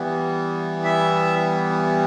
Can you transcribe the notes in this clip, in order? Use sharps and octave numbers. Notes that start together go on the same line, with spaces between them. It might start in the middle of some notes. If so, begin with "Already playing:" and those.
Already playing: E3 G3 B3
E5